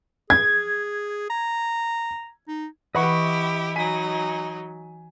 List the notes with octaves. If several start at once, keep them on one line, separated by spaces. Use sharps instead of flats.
G#4 G#6
A#5
D#4
E3 E4 G4 B4 D#5 F#5 B5 C#6
F#3 D#4 G#5 B6 D#7